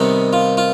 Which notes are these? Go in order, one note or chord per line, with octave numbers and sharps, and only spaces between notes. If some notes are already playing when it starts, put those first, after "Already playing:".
Already playing: C3 D#3 G3 B3 D#4
F4
F4